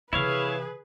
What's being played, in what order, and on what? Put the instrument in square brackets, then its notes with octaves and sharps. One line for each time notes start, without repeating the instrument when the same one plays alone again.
[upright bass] C3 E3 [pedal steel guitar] E4 C#5 F5 [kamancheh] G#4 B4